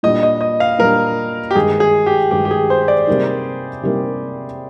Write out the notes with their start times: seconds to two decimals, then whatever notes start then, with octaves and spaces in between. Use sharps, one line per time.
0.03 A#2 G3 D4 D#5
0.23 D#5
0.41 D#5
0.60 F5
0.79 A#2 G3 D4 A#4
1.51 G4
1.55 G2 D#3 G#3 G#4
1.80 G#4
2.06 G4
2.31 G2 D#3 G#3 G4
2.45 G4
2.51 G#4
2.70 C5
2.88 D5
3.07 C3 G3 A#3 D#4
3.83 C3 G3 A#3 D#4